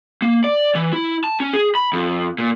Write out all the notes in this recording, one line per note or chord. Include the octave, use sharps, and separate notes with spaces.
A#3
D5
E3
E4
A5
C#4
G#4
B5
F2
A#2